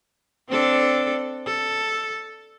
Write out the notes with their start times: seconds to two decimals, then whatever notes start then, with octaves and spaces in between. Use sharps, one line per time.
0.49 C4 D4 A4
1.46 A4